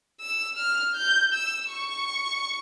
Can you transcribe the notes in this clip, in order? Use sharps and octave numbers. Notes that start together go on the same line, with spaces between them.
E6
F6
G6
E6
C#6